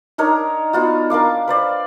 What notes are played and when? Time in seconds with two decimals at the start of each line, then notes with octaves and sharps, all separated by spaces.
0.18 D4 D#4 A#4 C#5
0.73 B3 F4 F#4
1.10 D4 A#4 F5 D6
1.48 B4 C5 D5